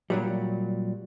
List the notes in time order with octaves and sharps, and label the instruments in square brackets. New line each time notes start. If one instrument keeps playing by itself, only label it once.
[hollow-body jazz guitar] A#2 F#3 G3